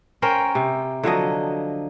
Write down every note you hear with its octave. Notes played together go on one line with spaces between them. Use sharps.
C#4 A#4 C5 G5
C3
D3 F3 F#3 D#5